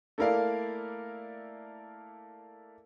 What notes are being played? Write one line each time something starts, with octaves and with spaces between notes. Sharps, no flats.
A3 A#3 E4 A#4 D5 F5